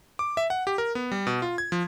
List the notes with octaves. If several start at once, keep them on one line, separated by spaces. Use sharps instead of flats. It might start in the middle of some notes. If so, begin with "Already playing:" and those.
D6
E5
F#5
G4
A#4
B3
G3
B2
F4
G#6
F3